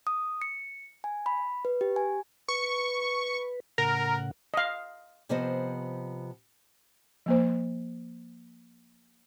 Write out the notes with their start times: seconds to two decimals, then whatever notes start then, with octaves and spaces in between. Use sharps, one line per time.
0.07 D#6
0.42 C#7
1.04 G#5
1.26 B5
1.65 B4
1.81 G4
1.96 G#5
2.48 B4 C#6
3.78 A2 C#3 A#4 F#5
4.54 D#5 F5
5.29 C3 F3 B3 C5 D#5
7.26 F3 A#3 C5